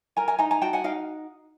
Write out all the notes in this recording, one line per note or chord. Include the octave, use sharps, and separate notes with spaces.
A#4 G#5 A#5
G#5 A#5
D#4 G#5 A#5
G#5 A#5
F#4 G5 A5
F#5 G#5
D#4 F5 G5